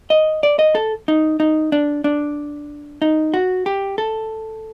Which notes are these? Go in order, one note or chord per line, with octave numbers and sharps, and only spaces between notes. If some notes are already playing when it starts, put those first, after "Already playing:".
D#5
D5
D#5
A4
D#4
D#4
D4
D4
D#4
F#4
G4
A4